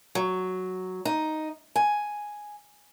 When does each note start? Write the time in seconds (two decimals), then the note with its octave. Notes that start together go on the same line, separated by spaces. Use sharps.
0.15 F#3
1.05 D#4
1.76 G#5